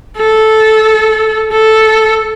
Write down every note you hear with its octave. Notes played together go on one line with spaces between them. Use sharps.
A4
A4